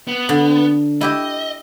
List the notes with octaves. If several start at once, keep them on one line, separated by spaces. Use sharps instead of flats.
B3
D3
E4 G4 D#5 E5